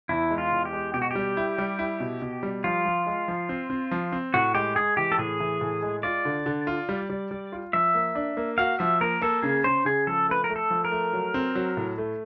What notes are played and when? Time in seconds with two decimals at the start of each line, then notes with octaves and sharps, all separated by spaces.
0.09 E2 E4
0.31 G#3
0.38 F4
0.52 E2
0.65 G4
0.73 G#3
0.94 B2 G4
1.02 F#4
1.11 G3 G4
1.37 E4
1.58 G3
1.79 E4
2.00 B2
2.22 B2
2.43 G3
2.64 F3 F4
2.85 F3
3.06 G#3
3.28 F3
3.49 C4
3.70 C4
3.91 F3
4.12 C4
4.34 A2 F#4
4.55 G#3 G4
4.76 G#3 G#4
4.97 E3 G4
5.12 A4
5.18 A2 G#4
5.40 E3
5.61 A2
5.82 G#3
6.03 F4 D5
6.25 D3
6.46 D3
6.67 F4
6.89 G3
7.10 G3
7.31 G3
7.52 F4
7.73 F3 E5
7.94 A#3
8.15 D4
8.37 A#3
8.58 F#4 F5
8.79 F3 E5
9.00 A#3 A#4
9.22 A#3 A4
9.43 C#3 G#4
9.64 C#3 C5
9.85 C#3 G#4
10.07 F3 A4
10.28 A3 B4
10.44 A#4
10.50 A3
10.56 A4
10.71 F3
10.85 A#4
10.91 A3
11.13 F#3
11.34 C4
11.55 F#3
11.77 A2
11.98 A3